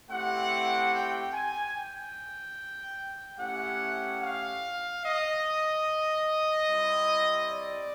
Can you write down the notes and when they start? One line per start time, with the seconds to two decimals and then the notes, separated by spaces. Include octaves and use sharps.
0.10 A3 C4 E4 G4 F#5
0.93 G5
1.33 G#5
1.75 G5
3.39 A3 C#4 E4 G4 F#5
4.21 F5
5.04 D#5
6.68 G3 C4 E4
7.50 D5